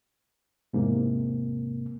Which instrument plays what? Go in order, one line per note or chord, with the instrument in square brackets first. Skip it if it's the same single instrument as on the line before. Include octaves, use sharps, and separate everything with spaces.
[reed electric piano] E2 G#2 C3 A#3